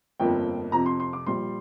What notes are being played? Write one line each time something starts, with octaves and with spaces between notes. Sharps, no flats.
G1 F2 F3 A#3 G5
F2 C3 F3 A#5
C6
C6
D6
A#1 A#2 G3 C6